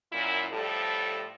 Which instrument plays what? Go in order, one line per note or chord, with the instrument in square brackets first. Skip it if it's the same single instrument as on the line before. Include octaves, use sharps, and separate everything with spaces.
[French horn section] F#2 A#2 E4
A2 F3 G3 A4